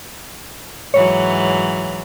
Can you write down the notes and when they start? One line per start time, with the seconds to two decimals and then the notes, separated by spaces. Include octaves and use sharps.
0.94 G#2 E3 F#3 C#5